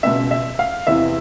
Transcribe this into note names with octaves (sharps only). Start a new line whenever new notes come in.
C#2 B2 E5
E5
F5
E2 C3 E3 E5